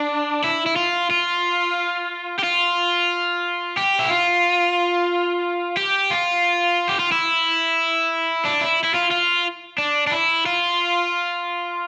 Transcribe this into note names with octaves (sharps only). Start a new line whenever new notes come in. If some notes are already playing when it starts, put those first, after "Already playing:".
Already playing: D4
E4
E4
F4
F4
G4
F4
G4
E4
F4
G4
F4
G4
F4
E4
D4
E4
E4
F4
F4
D4
D4
E4
F4